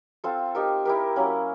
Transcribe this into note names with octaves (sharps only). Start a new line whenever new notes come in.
C4 F4 A4
D#4 G4 A#4
E4 G4 A#4
F#3 A#3 C#4